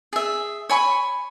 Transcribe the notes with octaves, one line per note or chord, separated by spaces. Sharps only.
G#4 E5
C#5 G#5 B5 C#6